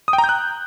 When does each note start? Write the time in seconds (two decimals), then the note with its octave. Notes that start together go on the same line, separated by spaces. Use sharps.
0.08 D#6
0.13 G5
0.18 A#5
0.24 G6
0.29 F#6